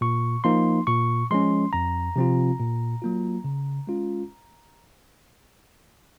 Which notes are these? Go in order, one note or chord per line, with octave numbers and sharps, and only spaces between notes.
A#2 C#6
F3 A#3 D#4 C6
A#2 C#6
F3 G#3 C#4 C6
F2 A#5
C3 F3 C4 F4
A#2
F#3 A#3 F4
C#3
G#3 C#4 F4